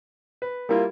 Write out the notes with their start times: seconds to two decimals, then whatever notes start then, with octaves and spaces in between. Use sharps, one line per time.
0.42 B4
0.69 G3 A#3 E4 F4